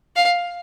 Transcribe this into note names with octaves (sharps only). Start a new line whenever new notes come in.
F5